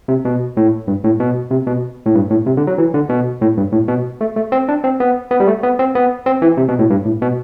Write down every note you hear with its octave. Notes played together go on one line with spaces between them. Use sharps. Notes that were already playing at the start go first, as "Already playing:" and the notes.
C3
B2
A2
G2
A2
B2
C3
B2
A2
G2
A2
C3
D3
F#3
E3
D3
B2
A2
G2
A2
B2
A3
A3
C4
D4
C4
B3
B3
G3
A3
B3
C4
B3
C4
E3
C3
B2
A2
G2
A2
B2